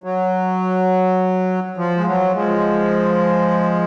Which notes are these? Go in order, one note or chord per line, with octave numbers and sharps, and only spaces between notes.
F#3
F3
G#3
F#3
F3 G#3